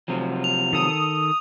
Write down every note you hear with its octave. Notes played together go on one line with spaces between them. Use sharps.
C3 F3 F#3
F7
D#3 A4 D#6